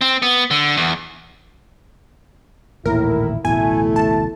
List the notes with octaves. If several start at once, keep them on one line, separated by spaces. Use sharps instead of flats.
C4
B3
D3
E2
D#1 A1 D#2 A2 E4 A#4
D1 A1 B2 A3 E4 G#5
A5